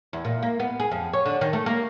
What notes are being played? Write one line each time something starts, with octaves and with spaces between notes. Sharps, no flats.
E2
A#2
A#3
B3
G#4
F2
C#5
D3
D#3
A3
A#3